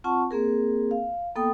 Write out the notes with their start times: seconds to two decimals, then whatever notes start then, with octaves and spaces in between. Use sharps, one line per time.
0.04 C4 F4 F#5 A5 C#6
0.31 A#3 C4 G#4 A#4
0.91 F5
1.35 A#3 B3 A4 G5 D#6